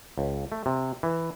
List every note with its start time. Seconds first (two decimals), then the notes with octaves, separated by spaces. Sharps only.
0.18 C#2
0.52 A3
0.66 C3
1.03 E3